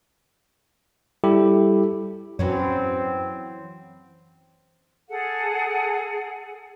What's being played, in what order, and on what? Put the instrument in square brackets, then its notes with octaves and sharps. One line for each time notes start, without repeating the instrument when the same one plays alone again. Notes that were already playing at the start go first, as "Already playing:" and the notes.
[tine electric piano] G3 E4 G4 A4
[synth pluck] F#2 [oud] E3 F#3 C#4 [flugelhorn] C4
[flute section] G#4 A4 F#5